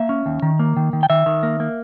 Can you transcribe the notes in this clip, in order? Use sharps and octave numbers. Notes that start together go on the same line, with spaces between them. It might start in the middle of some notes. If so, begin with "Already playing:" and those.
Already playing: A#3 E5
C#4
D#2
D#3
A#3
D#3
D#3
G5
D#3 E5
D#3
A#3
A#3